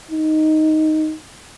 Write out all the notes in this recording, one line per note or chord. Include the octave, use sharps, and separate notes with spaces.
D#4